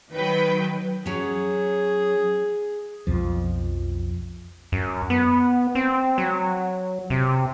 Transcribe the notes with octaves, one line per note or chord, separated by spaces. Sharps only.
D#3 F#3 B4 G5
F#3 C#4 G#4
B1 F2 F3
F#2
B3
C4
F#3
C3